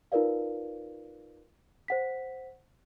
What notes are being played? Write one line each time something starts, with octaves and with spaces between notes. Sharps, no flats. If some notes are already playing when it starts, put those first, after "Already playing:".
D#4 F4 A#4 B4 D5 F5
C5 F#5 B6